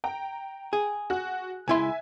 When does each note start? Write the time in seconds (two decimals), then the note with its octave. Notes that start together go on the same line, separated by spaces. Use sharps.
0.04 G5 A#5
0.73 G#4
1.10 F#4 F#6
1.68 C#2 E4 E5 G#5 C6